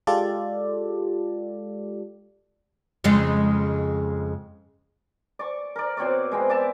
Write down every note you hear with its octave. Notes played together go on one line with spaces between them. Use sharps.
G#3 F4 G4 A4 D5
F2 C#3 G#3
D5 C#6
A#4 D5
B2 C4 C#5 D5
G#3 B3 C4
D5 E5 A5